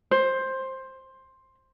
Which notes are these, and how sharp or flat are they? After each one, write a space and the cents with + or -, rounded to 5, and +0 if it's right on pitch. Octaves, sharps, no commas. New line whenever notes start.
C5 +10